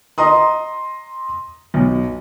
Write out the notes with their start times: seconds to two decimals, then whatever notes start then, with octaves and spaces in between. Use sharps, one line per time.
0.18 D#5 A#5 C6 D#6
1.74 B1